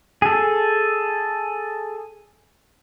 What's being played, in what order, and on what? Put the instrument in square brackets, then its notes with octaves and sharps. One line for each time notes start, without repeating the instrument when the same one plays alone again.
[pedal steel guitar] G#4 A4